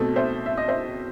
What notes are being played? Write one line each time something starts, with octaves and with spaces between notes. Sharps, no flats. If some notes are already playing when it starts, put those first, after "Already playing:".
Already playing: B2 A3 C4 A4
C5 E5
E5
D#5
C5 E5